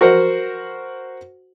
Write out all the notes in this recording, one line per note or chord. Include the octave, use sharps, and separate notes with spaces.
F#4 A#4 C5 F#5